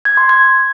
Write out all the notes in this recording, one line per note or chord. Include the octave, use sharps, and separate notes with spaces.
G#6
C6
G#6